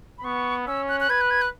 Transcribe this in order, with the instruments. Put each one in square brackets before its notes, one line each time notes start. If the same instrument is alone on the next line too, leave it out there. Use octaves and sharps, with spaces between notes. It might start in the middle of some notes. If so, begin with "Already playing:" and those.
[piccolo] B5
[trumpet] B3 [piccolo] C#6
[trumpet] C#4 [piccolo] E6
[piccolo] F#6
F#6
[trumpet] B4 [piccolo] G#6
[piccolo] F#6
G#6
F#6